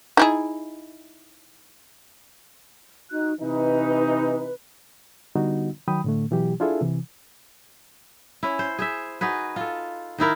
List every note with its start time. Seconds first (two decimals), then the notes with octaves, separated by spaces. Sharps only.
0.17 D#4 E4 G#4
3.11 D#4 F#4 F#6
3.40 C3 E3 D#4 B4
5.35 D3 G3 B3 D#4 F#4
5.88 D#3 F#3 G5 B5 D#6
6.04 A2 D3 A3
6.31 B2 E3 F#3 G4
6.60 D4 E4 F4 G#4 A4 E5
6.81 C3 E3
8.43 C#4 E4
8.59 C5
8.79 G#4 C5 E5
9.21 D#4 F#4 G#4 B4
9.56 F4 A4
10.18 D#3 D#4 E4 A#4